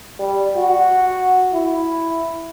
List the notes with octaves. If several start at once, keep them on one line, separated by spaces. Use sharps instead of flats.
G3
F#4
E4